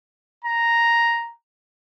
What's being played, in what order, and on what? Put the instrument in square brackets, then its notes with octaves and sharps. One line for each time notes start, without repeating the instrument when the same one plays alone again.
[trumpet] A#5